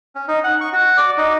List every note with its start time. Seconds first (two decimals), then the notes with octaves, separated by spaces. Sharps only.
0.15 C#4
0.28 D#4
0.44 F#5
0.61 C#6
0.73 F#4
0.97 D5
1.17 D#4